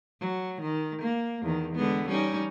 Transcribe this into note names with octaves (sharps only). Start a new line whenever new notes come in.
F#3
D#3
A#3
E2 D#3
D3 G#3 B3
G3 C#4 D#4